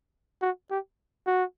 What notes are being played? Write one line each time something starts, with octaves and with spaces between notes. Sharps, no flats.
F#4
G4
F#4